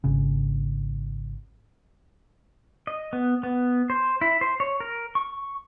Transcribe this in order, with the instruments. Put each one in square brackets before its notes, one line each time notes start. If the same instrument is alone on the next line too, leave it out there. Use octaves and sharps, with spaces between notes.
[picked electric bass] G#1 C#3
[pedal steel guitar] D#5
B3
B3
C5
E4
C5
C#5
A#4
C#6